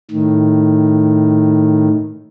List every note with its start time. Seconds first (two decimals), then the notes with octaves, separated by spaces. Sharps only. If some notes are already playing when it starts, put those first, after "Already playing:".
0.11 A2 D#3